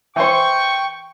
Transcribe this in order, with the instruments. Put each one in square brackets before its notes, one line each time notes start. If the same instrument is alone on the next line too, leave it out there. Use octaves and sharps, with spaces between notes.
[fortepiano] E3 C5 [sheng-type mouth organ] G5 [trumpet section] C#6